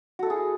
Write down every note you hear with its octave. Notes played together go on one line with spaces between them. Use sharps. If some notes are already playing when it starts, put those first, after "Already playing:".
E4 F#4 G#4 A4